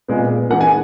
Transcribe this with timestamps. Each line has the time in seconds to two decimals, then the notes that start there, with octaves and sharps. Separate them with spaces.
0.08 A#2 G#3 B3
0.50 E3 G#3 D#4 F#5
0.61 G#5